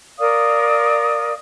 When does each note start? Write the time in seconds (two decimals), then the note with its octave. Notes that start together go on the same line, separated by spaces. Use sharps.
0.19 A#4 D5 F5 D#6